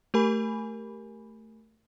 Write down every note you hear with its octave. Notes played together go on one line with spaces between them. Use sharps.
A3 G4 A#4 G#5 B5